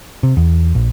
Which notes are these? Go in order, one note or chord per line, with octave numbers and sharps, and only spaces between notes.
C3
E2
A#1